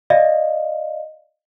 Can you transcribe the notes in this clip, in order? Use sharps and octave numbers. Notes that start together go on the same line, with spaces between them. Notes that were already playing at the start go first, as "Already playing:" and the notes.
D5 D#5 F5